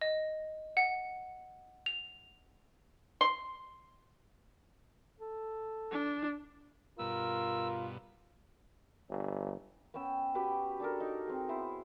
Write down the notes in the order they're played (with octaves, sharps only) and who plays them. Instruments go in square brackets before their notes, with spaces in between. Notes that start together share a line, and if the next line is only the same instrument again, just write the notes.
[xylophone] D#5
F#5
F7
[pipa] C6
[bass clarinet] A4
[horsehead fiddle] D4
[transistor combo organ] G2 B2 [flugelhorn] F4 [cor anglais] A#4 [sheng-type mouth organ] E6
[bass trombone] G1
[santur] B3 C#4 G5 E6
F#4 G4 B4 G5
D4 A4 A#4
D#4
C4 G#4
B3 E4 C5